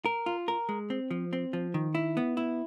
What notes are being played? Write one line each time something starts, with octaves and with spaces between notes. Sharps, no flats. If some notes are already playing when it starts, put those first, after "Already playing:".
A#4
F4
A#4
G#3
C4
F3
C4
F3
D#3
E4
B3
E4